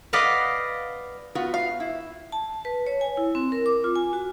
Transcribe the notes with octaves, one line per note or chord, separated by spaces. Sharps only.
B4 D5 D#5 F5 F#5
B3 F4 F#4
F5
E4
A5
B4
C#5
G#5
E4
C4
A#4
D6
F4
G#5
F#4